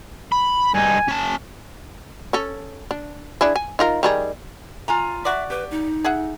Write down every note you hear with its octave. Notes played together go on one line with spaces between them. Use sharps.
B5
G2 D#4 G#5
C#4 A5
C#4 A4
D4
D4 E4 G#4
G#5
D#4 F4 A#4
D#3 G3 G#4
F4 G#5 A#5
F#4 D5 E5
G4 B4
D#4
G#4 E5 F#5